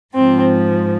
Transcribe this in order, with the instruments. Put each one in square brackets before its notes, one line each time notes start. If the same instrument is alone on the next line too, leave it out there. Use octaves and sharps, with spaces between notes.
[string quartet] G#2 F3 C4